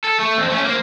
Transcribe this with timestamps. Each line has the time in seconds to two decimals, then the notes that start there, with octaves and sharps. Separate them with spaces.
0.05 A4
0.20 A3
0.38 F2 C4
0.50 A3 C#4
0.65 A#3 C5